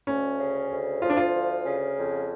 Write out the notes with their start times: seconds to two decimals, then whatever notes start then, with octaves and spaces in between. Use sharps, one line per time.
0.07 D2 C#4
0.38 C#3
0.70 D2
1.02 F3 F4
1.09 D4
1.17 F4
1.34 D2
1.65 C#3
1.97 F2